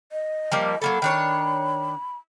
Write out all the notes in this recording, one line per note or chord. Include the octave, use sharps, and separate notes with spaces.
D#5
F3 G3 A#3
F#3 A#3 A4 B5
D#3 D4 C#5